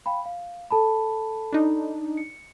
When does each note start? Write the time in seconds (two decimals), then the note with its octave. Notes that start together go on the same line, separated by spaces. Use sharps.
0.06 F5 G5 B5
0.26 F5
0.71 A4 A5 B5
1.53 D4 D#4
2.17 C#7